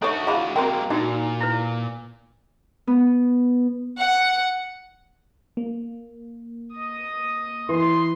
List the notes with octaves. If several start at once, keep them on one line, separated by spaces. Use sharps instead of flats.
D4 D#4 F#4 A4 C#5 E5
E3 G#3 F4 G#4 B5
G#3 A#3 C4 F#4 A#4 G5 A#5
A#2 D4 D#4 F#4
E4 B4
B3
F#5
A#3
D#5 D#6
E3 C6